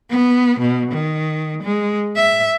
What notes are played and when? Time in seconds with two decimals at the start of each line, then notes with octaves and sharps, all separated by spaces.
0.11 B3
0.59 B2
0.91 D#3
1.63 G#3
2.16 E5